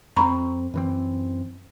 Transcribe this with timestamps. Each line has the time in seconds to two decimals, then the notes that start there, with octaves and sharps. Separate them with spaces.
0.16 F2 A#3 C4 A#5 B5 C#6
0.74 F#2 E3 C4